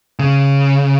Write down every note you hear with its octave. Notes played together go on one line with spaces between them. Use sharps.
C#3